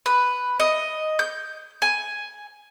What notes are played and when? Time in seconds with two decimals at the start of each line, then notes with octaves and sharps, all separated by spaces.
0.06 B4
0.60 D#5
1.19 G6
1.82 G#5